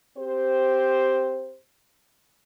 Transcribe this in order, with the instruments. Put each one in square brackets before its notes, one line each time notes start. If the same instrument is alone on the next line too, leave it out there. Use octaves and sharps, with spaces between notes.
[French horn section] C4 G4 C5